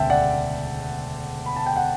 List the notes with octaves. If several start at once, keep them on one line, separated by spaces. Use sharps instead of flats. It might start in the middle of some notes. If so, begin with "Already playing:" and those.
Already playing: E1 D2 C#3 E5 G5 A5
D5 F#5
B5
A5
G5
F#5